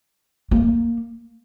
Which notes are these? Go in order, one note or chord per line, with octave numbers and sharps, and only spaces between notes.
A#3